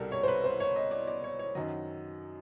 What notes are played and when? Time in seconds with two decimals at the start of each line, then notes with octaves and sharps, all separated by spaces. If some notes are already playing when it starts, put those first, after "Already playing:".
Already playing: C2 B2 G3 A4 A#4
0.12 C#5
0.23 C5
0.28 B4
0.44 C5
0.60 C#5
0.76 D#5
0.91 D5
1.07 D5
1.24 C#5
1.39 C#5
1.55 F#2 D#3 F#3 D#5